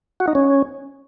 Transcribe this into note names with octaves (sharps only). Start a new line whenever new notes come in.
F#4
D#4
C#4